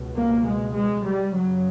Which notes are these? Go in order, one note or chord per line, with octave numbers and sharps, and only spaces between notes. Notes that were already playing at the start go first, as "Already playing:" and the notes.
Already playing: C#2 B2
A#3
G#3
G#3
G3
F#2 C#3 F#3